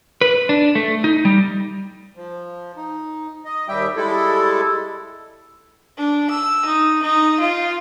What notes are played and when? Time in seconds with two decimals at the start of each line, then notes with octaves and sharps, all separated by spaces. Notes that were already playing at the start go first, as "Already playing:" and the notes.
0.21 B4
0.49 D4
0.75 A3
1.04 D#4
1.25 G3
2.17 F3
2.77 D#4
3.45 D#5
3.68 D#2 G3 G4 E5 G5
3.96 G3 G#3 E4 A4
5.97 D4
6.30 E6
6.65 D#4
7.02 D#4
7.40 F4